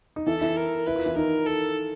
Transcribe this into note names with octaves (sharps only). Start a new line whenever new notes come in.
D#4
E3 E4 A4
E3 E4
A#4
E4 B4
F4
E3 E4
D#3 D#4 A#4
A4